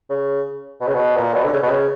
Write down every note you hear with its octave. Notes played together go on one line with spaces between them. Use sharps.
C#3
B2
C#3
B2
A#2
B2
D3
C#3
B2
C#3